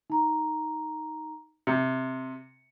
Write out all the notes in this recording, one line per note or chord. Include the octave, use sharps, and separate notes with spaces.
D#4 A#5
C3 C#7